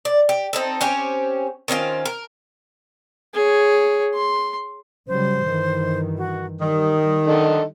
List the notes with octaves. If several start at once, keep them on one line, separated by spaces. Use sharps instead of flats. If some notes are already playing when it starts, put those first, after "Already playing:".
D5
G4
C4 D#4 A4
C4 C#4 G4 C#5
D#3 C4 C#4 F4
A#4
G#4 C#5
C6
C#3 F#3 G3 C5
G2 D#3 E3
F#4
D#3 G3 D#6
D3 D#4 A4